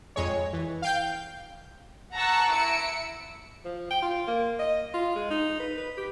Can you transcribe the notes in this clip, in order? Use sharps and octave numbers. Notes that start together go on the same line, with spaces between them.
F2 G#3 C#5
E3
F5 G5 G6
F#5 A5 A#5 C#6 E6 F#6
E4 E6 C#7 D7
F3
G5
F4
A#3
D#5
F4
G#3
D#4
B4
B4
G4